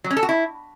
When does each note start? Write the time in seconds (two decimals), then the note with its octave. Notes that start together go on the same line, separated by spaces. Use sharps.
0.04 F#3
0.10 C#4
0.17 A4
0.23 F#4
0.29 E4